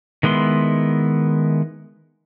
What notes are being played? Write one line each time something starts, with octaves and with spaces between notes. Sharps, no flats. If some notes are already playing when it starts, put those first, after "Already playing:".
D#3 G#3 B3 E4 C6